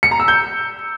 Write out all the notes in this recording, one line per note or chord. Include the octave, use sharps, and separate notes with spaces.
C#7
A#5
E6
G6